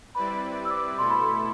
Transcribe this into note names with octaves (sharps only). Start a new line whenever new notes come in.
G3 C4 E4 B4 D5 B5
E6
D6
B2 A3 E4 A4 C6
B5
C6